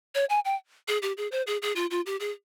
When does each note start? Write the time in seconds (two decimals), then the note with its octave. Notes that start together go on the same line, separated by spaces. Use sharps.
0.15 C#5
0.29 G#5
0.45 G5
0.88 G#4
1.02 G4
1.17 G#4
1.32 C5
1.47 G#4
1.62 G#4
1.76 F4
1.91 F4
2.06 G4
2.20 G#4